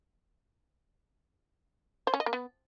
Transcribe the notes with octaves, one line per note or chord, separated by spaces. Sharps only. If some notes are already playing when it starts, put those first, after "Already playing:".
C5
C#4
D#5
A#3
B3